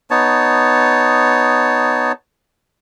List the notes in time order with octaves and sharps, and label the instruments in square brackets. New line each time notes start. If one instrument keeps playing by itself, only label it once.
[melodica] B3 D#4 C#5 A5